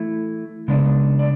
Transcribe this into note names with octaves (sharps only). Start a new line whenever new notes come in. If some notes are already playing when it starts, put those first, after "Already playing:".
Already playing: E3 A3 E4
C#3 G#3 B3 D4
D5